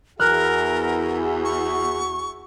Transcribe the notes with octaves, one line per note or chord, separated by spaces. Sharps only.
E2 F#4 G#4 A#4 E5 F6 F#6
C#6